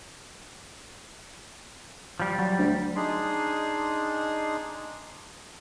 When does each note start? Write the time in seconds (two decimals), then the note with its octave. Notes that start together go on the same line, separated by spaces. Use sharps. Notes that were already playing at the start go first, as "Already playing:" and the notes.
2.20 F3 G3
2.39 F#3
2.58 D2
2.96 D4 D#4 G#4 C6